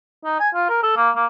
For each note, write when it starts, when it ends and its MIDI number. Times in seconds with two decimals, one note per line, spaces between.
0.25 0.39 63
0.40 0.49 80
0.54 0.68 65
0.69 0.79 70
0.83 0.95 69
0.97 1.10 58
1.16 1.26 58